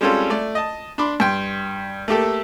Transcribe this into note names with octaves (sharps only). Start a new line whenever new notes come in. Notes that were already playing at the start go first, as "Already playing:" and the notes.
G3 G#3 C4 C#4 F4 A4
A3 D5
D#5 A5
D4 B5 C6 D6
G2 G5 C6
A3 A#3 G4 A4